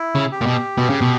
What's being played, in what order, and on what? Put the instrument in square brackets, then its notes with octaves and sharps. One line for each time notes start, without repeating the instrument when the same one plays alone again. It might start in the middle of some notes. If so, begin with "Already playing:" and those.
Already playing: [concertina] E4
[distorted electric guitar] C#3
[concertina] G4
[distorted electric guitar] A#2
B2
B2
C#3
B2